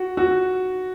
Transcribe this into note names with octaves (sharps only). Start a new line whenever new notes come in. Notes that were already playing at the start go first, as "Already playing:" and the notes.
Already playing: F#4
F#4